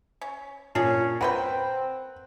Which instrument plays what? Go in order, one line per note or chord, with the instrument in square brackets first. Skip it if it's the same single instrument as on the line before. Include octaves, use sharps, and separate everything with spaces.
[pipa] C#4
[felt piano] A#2 [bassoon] C#4 [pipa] D4 G#4
[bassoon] C4 [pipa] A#4 B4 G5 [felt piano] F#5